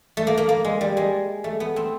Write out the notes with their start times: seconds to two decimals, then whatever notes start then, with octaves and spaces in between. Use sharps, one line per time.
0.17 A3
0.27 A#3
0.37 A#3
0.49 A#3
0.65 G#3
0.81 G3
0.97 G#3
1.44 A3
1.60 B3
1.76 C4